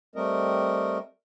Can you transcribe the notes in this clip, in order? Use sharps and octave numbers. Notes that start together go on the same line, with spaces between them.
G3 A3 C4 A#4 D#5